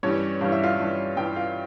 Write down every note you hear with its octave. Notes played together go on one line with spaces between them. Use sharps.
G2 E3 G3 C#4 C#5
G2 E3 G3 F5
E5
F4 F5
G2 E3 G3
G2 E3 G3 G4 G5
F4 F5